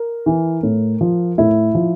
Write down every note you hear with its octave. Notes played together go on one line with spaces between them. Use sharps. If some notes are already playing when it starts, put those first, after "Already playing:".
Already playing: A#4
E3
A2
F3
A2 E4
F3